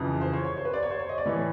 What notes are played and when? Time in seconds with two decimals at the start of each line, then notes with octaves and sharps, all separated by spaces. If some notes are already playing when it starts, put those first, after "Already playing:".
Already playing: F2 C#3 E3
0.21 C5
0.33 C#5
0.44 C#5
0.57 C5
0.65 B4
0.74 D5
0.83 C#5
0.90 C5
0.99 C#5
1.09 D#5
1.18 D5
1.25 A2 E3 C#5